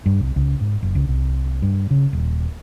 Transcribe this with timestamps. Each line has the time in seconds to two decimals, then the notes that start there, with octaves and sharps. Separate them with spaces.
0.06 G2
0.20 C2
0.36 C#2
0.61 G#2
0.83 F#1
0.95 C#2
1.09 C2
1.62 G2
1.91 C#3
2.13 D#1